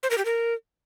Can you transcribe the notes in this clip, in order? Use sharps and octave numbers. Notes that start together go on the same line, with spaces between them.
C5
A#4
G4
A#4